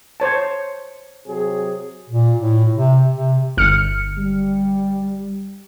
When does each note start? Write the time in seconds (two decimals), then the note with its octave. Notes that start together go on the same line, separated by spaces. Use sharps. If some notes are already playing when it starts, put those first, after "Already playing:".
0.20 C5 C#5 A5
1.27 C3 F#3 G#4
2.10 A#2
2.41 A2
2.74 C3
3.13 C3
3.57 G1 F6 C#7
4.17 G3